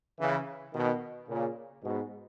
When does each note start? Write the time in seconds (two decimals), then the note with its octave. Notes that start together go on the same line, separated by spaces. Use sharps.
0.19 C#3 E3
0.74 B2 D#3
1.28 A#2 C#3
1.83 G#2 B2